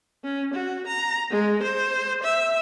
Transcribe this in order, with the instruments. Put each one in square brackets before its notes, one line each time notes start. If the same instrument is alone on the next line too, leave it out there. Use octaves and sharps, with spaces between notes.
[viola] C#4
F#4
A#5
G#3
C5
E5